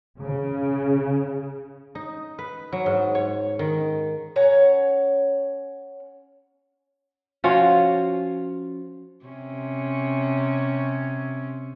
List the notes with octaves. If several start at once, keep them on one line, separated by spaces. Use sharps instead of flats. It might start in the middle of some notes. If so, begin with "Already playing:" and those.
C#3
D#4
B4
F#3
G#2
C#5
D#3
C#4 C#5 F#5 A#5
F3 C#4 F4 F#4
C3 C#4